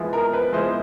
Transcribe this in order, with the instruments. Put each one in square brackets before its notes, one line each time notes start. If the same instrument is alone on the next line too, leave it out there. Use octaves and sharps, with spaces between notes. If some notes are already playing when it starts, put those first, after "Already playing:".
Already playing: [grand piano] F3 G#3 B3 E4
[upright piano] A#4
B4
[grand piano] F3 G#3 B3 E4 [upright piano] C5